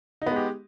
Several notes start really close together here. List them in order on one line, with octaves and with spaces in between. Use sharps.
D#4 B3 G#3 G4